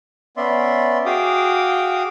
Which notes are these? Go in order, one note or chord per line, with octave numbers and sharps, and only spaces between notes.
B3 C#4 D5 E5 C6
F#4 G#4 F5 G5 D6 D#6